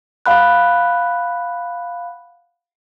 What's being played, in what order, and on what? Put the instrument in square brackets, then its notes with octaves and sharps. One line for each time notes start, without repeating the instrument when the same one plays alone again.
[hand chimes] F5 F#5 B5 F#6